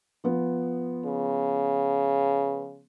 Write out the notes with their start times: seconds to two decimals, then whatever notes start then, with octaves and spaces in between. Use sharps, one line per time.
0.24 F3 B3
1.05 C#3